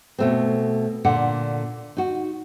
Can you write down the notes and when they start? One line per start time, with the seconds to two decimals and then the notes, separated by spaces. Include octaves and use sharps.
0.18 B2 A3 C4
1.05 A#2 D3 F#5
1.97 D#4 F#4